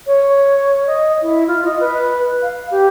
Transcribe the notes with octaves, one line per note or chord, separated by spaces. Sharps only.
C#5
D#5
E4
F4
D#5
B4
F5
G4